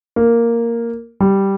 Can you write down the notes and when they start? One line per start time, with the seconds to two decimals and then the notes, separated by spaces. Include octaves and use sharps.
0.16 A#3
1.20 G3